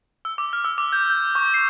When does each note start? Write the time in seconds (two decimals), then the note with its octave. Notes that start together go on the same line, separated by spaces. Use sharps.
0.25 E6
0.38 D6
0.53 F6
0.65 E6
0.78 D6
0.92 G6
1.10 G6
1.35 C#6
1.54 C7